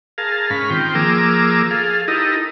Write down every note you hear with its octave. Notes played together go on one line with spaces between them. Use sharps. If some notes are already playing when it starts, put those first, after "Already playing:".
G#4 A#4 F5 A5
G#2 C#4 B5 F6
D#3 C4 F4 G5
F3 A#3 G#4 A#4 D6 E6
G#4 A4 F5
D#4 E4 G4 A4 A#4 D#5